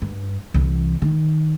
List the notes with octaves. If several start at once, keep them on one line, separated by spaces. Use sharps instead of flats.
G2
C2 E3
D#3